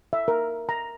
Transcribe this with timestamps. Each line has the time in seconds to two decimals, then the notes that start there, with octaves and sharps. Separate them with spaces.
0.13 E5
0.28 A#4
0.69 A#5